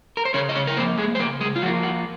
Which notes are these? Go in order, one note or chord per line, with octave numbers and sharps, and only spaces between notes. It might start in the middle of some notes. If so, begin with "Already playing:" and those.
A#4
C5
C#3 C#4 C#5
D#5
C#4 C#5
A#4
F3 A#3 C4 C5
G#3 G#4
C5
C#3 A#3 A#4
G#3 G#4
F4
F3 A#3 F#4
F#4